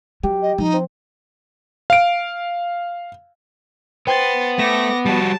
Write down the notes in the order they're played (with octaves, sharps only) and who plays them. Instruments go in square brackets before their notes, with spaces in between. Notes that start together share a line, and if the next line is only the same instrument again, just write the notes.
[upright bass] F#3 [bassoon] G4
[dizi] D#5
[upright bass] F3 [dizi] D#4
[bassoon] C4
[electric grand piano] F5 D7
[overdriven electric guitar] B3 [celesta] C5 G5 [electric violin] C6 A6
[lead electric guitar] A3 [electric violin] D6 A#6
[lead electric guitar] G3 F#4 [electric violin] A5